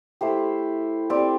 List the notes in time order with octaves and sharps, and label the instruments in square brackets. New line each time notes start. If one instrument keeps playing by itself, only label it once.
[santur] A3 E4 G4 C5
C4 G4 D5